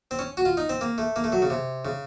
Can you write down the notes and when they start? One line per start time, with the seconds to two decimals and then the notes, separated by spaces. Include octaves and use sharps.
0.11 C4
0.19 C#4
0.37 F#4
0.45 F4
0.57 D#4
0.69 C4
0.81 A#3
0.98 A3
1.16 A#3
1.24 A3
1.32 F#3
1.42 C#3
1.50 C3
1.85 C#3